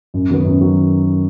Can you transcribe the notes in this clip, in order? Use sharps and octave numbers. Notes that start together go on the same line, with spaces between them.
F#2
D#3 F#3 B3
F#2
D#3 F#3 B3